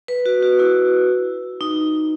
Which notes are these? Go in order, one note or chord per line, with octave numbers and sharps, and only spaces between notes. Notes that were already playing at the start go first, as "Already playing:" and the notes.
B4
F#4
F#4
E4
D#4